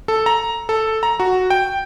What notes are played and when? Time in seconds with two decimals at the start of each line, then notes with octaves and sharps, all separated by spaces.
0.08 A4
0.26 A#5
0.69 A4
1.03 A#5
1.20 F#4
1.50 G5